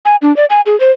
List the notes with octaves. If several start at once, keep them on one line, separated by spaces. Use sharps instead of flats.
G#5
D4
D5
G#5
G#4
C5